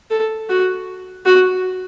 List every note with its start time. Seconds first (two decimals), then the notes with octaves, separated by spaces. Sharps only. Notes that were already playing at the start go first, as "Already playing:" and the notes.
0.10 A4
0.49 F#4
1.26 F#4